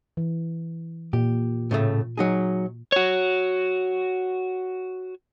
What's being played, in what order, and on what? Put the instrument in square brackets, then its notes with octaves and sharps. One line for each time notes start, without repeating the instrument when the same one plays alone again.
[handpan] E3
[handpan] A#2 [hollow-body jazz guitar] G4
[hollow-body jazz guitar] A2 C#3 A3
F#3 D#4 G#4
[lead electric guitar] F#4 C#5